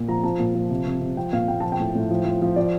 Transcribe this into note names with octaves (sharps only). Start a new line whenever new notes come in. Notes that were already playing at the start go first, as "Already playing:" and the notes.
Already playing: A#2
F3 A#5
F3 A5
A#2
F3
C3
C3
C3
F3 G5
A#2 F5
A#2 G5
F3 A5
G5
A2
A2
F3
F3
F3
F3 D5